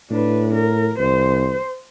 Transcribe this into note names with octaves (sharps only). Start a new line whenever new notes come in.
A2 D4 B4
A#4
C2 C5